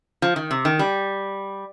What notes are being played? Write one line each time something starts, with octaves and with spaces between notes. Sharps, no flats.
F3
D#3
C3
D#3
G3